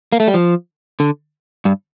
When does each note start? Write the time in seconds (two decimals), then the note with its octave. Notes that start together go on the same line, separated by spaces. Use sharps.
0.12 A#3
0.20 A3
0.28 G3
0.34 F3
1.00 D3
1.65 G2